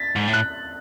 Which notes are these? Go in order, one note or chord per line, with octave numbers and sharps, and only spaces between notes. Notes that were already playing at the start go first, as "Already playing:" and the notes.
Already playing: A6 B6
G#2
A2
F#6